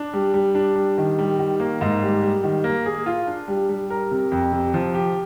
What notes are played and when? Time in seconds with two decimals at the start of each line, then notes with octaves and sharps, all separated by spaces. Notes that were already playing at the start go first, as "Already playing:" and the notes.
Already playing: D4
0.13 G3
0.34 G3
0.55 D4
0.76 G3
0.98 D#3
1.19 G3
1.39 D#3
1.60 A#3
1.81 G#2
2.02 G3
2.22 G3
2.44 D#3
2.64 A#3
2.86 G#4
3.06 F4
3.27 D4
3.48 G3
3.69 G3
3.90 A#4
4.11 C3
4.32 F2
4.52 C3
4.74 F3
4.94 G4